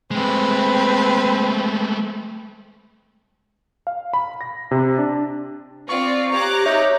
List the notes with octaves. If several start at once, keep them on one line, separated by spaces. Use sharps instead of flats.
G#3 A3 C4 B4
F5
B5
A#6
C3
D4
C4 F4 D5 C#6
G4 C5 C#5 A#5 D6 F#6
D#4 G4 C#5 E5